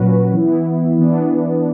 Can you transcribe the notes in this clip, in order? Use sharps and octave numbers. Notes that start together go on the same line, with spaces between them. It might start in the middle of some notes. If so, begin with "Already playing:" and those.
Already playing: A#2 F#3 C#4 F#4 B4
E3 B3 E4
E3 B3 D4